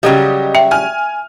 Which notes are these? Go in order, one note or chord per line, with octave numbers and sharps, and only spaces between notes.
C#3 F#3 G3 G4 D#5
E5 G5
G#5 F6